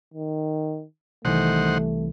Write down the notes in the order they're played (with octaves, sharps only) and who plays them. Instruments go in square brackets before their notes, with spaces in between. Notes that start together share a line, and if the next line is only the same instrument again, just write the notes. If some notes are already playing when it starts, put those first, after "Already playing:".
[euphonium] D#3
[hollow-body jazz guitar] C2 E3 [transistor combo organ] D#3 C5 F#5 [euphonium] A3